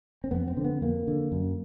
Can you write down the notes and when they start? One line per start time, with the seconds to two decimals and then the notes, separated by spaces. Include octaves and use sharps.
0.24 C4
0.31 F2 B3
0.47 C4
0.57 D3
0.64 B3
0.81 F2 A#3
1.07 D3
1.32 F#2